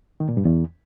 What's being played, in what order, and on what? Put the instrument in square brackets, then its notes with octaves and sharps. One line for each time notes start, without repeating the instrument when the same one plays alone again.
[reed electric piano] D#3
A#2
G2
E2